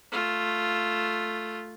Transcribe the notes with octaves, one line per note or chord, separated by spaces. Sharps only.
A3 F4